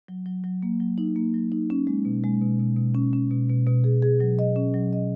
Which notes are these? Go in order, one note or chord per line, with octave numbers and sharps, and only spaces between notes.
F#3
F#3
F#3
A#3
F#3
D#4
A#3
F#3
D#4
C#4
G#3
B2
G#3
B2
B2
B2
C#4
C#4
B2
B2
B2
G#4
G#4
F#3
D#5
C#4
F#3
D#5